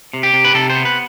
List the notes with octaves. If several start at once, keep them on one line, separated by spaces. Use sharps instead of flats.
C3
G4
C3
B4
C3 A4
C5
B3
B4